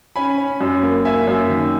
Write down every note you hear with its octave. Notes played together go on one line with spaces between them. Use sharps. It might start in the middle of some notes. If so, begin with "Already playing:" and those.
C#4 G#5 B5
C#4
F#2
A#3
A#3 E5 G#5
F#2
D#3